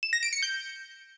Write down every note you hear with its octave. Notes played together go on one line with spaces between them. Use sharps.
E7
A#6
D7
C#7
G6